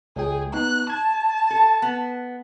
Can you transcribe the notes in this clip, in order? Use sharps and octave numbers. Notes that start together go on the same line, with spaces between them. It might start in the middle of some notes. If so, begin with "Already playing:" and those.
C#2 G#4 G5
B3 D#4 F#6
A5 G#6
A4
B3